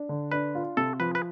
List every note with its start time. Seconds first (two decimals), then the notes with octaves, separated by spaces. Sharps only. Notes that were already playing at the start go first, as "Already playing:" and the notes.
Already playing: D4
0.09 D3
0.32 D4 B4
0.55 F4
0.77 C3 A4
1.00 F3 B4
1.15 B4